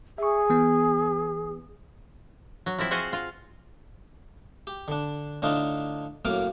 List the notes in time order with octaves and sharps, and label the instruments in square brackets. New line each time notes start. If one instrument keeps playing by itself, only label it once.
[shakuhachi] G#4 [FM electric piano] E5 C#6
[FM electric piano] E3 B3
[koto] F#3
F3 C4 E4
F4 F#4 G#4 C5
F4
[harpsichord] G4
D3 D4
A2 D3 D4 D#4 F4
F#2 A2 A#3 F5 D6